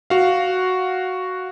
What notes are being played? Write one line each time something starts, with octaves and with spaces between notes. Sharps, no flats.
F#4 F5